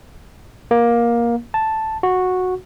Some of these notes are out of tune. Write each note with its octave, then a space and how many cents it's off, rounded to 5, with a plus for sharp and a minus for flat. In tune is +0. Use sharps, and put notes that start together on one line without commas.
A#3 +15
A5 +0
F#4 -10